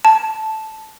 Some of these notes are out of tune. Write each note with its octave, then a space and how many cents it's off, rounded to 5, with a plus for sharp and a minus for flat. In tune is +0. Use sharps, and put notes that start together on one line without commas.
A5 -5